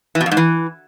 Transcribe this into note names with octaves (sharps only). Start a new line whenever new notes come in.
E3
B2
F2
G#2
E3